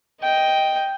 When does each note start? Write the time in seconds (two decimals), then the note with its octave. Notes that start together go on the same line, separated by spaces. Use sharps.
0.21 D#5 G5